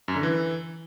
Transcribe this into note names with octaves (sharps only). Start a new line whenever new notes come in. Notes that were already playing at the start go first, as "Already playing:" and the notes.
F#2
D3
E3